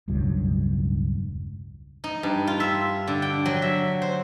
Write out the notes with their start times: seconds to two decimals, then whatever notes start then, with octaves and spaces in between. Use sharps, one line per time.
0.08 E1 C#2 G2 F#3
2.04 D#4
2.23 G2
2.47 F4
2.60 E5
3.07 D3
3.22 G5
3.46 F#3
3.62 E5
4.02 C5